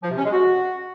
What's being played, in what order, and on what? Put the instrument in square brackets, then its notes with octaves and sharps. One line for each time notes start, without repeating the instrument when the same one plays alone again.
[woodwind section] F3
C3
C#4
G#3
F#4